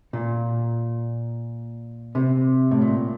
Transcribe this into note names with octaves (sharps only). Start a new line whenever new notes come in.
A#2
C3
A2
A#2